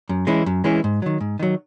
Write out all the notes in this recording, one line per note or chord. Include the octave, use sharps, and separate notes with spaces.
F#2
E3 G#3 C#4 E4
F#2
E3 G#3 C#4 E4
G#2
D#3 F#3
G#2
D#3 F#3